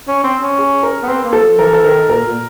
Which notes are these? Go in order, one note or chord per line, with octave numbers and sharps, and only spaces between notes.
C#4
C4
C#4
G#4
A#4
B3
C4 B4
A#3
A4
F3
E3 A#4
A4
D#3 A#4
A#2 A#4
A#2